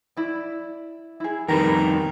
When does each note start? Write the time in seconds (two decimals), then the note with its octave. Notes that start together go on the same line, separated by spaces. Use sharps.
0.17 E4 D5
1.20 E4 G#4
1.49 F2 D#3 G3 G4 A#4 B4